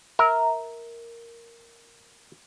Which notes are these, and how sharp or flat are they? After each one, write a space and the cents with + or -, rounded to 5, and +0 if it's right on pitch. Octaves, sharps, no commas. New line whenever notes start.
A#4 +0 E5 -25